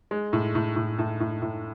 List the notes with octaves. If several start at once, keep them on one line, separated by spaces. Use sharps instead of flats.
G#3
A2
A2
A2
A2
A2
A2